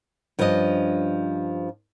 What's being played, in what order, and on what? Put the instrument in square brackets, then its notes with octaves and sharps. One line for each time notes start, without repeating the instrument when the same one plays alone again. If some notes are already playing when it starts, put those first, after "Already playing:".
[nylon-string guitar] G2 F3 C#4 D4 E4 D#5